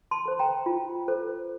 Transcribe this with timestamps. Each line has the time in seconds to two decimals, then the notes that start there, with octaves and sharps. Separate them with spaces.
0.11 A5 C6
0.25 A4 C5
0.39 G5 A#5
0.66 F4
1.08 A4 C5